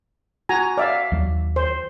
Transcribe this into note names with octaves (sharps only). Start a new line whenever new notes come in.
F#4 G#5 A#5
D5 E5 F5
D#2 F#3
C5